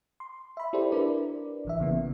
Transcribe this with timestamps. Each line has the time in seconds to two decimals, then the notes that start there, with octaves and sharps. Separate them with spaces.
0.20 C6
0.57 E5 B5
0.73 E4 G4 A4 C5 D5
0.92 D4 E4 A#4 B4 D5
1.65 A1 E3 E5
1.80 C#3 E3 A#3 B3